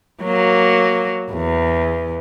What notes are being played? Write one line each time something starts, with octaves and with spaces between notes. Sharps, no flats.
F#3 A#3
E2